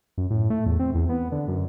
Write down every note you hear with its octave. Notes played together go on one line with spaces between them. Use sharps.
F#2
A2
A3
E2
C4
E2
B3
D3
F#2